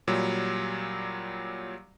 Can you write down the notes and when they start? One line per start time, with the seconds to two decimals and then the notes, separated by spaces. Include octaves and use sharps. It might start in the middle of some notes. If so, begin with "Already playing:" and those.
0.08 A#2 F#3 G3